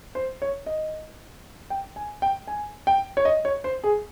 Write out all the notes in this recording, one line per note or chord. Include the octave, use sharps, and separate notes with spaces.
C5
C#5
D#5
G5
G#5
G5
G#5
G5
C#5
D#5
C#5
C5
G#4